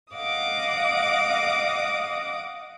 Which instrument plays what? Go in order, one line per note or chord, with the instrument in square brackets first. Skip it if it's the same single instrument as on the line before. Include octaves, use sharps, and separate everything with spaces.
[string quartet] D#5 F5 F#5 D6 D#6